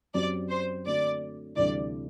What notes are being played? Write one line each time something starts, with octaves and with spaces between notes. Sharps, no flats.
F#2 F#3 C4 G4 D5
C5
D3 A3 C4 F#4 D5
D2 C3 E3 G3 D5